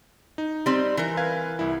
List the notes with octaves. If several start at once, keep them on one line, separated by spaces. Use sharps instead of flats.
D#4
G3 C4
E3 A#4
B4 F5 G#6
C2 E4